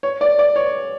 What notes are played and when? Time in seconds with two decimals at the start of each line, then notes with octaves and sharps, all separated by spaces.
0.03 C#5
0.21 D5
0.39 D5
0.56 C#5